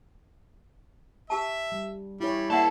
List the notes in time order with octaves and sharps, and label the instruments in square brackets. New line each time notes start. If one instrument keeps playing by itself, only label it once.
[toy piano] G4 A5 [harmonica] E5
[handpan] G3
[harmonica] G3 [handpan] E4 C#5
[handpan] G#3 A#3 [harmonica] E4 [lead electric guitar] G#4 A5 [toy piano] D5 E5 F#5